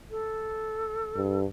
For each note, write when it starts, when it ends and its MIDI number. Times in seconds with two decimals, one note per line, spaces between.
0.10 1.39 69
1.16 1.45 43